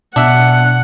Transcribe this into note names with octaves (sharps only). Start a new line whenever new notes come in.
B2 D4 E5 F#5